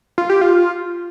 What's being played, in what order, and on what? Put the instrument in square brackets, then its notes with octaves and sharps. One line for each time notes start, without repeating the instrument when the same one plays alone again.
[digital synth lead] F4
G4
F4